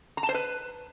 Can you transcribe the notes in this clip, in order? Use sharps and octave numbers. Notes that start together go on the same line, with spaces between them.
A#5
A5
C5
B4